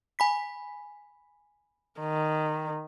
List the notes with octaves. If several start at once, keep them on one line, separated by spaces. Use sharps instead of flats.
G#5 B5 B6
D#3